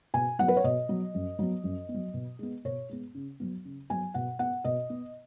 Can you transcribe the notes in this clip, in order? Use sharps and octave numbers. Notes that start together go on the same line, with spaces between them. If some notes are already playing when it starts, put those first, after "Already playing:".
B2 G#5
F#3 B3 F#5
B4
C#5
B2 D#5
F#3 B3
F#2
F#3 B3
F#2
B3
F#3
B2
G#3 B3
B2 C#5
G#3 B3
C#3
F#3 B3
C#3
F#3 B3 G#5
B2 F#5
B3 F#5
B2 D#5
B3